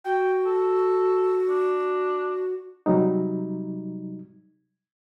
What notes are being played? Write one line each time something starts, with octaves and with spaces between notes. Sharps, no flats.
F#4 G5
A4
D4
C3 F#3 G3 D#4